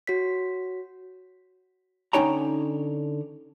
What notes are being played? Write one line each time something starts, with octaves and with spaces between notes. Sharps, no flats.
F#4 C#5 B6
D3 C#4 D#4 C#5 G5 A#5